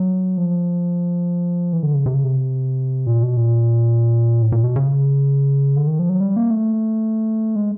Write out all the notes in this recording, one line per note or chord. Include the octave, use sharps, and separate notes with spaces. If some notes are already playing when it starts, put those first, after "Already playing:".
Already playing: F#3
F3
E3
D3
C#3
C3
C#3
C3
A#2
B2
A#2
A2
A#2
B2
C#3
D3
D#3
F3
F#3
G3
A#3
A3
G#3